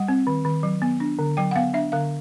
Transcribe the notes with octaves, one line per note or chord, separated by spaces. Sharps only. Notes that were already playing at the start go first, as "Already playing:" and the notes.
Already playing: G3 F#5
C4
D#3
D#3
F#3
B3
D4
D3
F#3 G5
F#5
B3 F5
D4 E5
D3 F5